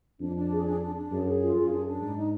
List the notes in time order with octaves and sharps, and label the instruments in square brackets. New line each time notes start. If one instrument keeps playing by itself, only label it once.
[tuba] F2 [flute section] D4
[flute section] D4
G#4
D4
D4
D4
[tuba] F#2 [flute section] G#4
[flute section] G#4
F4
[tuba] F#2 [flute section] G#4
[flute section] D4
D4
[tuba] G#2 [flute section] D#4
[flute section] D#4